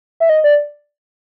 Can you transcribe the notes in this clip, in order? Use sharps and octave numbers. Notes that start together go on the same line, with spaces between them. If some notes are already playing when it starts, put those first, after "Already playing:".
E5
D#5
D5